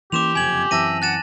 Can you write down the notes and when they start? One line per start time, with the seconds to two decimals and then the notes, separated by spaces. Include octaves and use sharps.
0.12 E3 A#3 C#4 G4 C6 D6 E7 F7
0.35 F#1 F2 C3 G#5 G#6 F#7
0.71 F#2 E3 C4 E5 A5 A#6 D#7
1.02 F#5 F#6 A6 E7